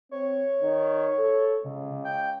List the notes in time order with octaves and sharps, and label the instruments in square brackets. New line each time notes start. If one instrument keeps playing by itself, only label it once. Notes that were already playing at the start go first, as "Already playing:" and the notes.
[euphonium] C4 [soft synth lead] C#5
[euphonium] D#3
A4
[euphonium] C#2 [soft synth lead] C#3
[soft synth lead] G5